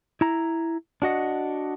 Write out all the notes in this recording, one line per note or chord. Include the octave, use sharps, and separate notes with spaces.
E4 A#5
D4 F#4 D#5 F#5